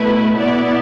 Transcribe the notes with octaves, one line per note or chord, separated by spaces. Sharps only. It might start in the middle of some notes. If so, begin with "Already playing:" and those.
Already playing: B2 A3 E4 B4
B2 B3 E4 D5